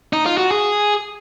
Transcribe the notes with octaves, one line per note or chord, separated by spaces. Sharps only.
D#4
F4
F#4
G#4